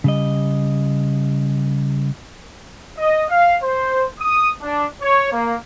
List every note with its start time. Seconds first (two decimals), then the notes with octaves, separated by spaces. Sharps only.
0.04 C#3 G3 D#5
2.97 D#5
3.29 F5
3.62 C5
4.20 D#6
4.62 D4
5.01 C#5
5.32 A#3